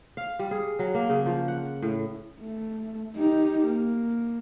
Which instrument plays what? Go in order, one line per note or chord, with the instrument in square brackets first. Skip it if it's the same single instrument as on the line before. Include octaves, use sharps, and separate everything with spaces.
[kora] F5
G3
G#4
F#3
A#3
C#3
F3
F#5
A2
[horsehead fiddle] A3
D#4 G4
A#3